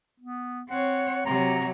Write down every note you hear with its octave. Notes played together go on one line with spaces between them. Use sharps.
B3
C4 C#5 F#5
C3 F#3 A#5